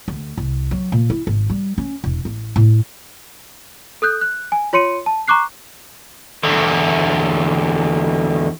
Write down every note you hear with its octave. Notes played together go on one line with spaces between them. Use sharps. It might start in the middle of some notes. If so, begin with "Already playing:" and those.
D2
C2
F#3
A#2
E4
G#1
G3
C#4
E1
A1
A2
A4 D#6 F#6 G6
F#6
G#5
F4 C#5 C6 C#7 D#7
A5
A#5 C#6 D6 F#6 C7
E2 D3